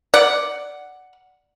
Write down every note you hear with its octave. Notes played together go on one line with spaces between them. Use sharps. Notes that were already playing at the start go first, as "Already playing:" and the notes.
D5 F#5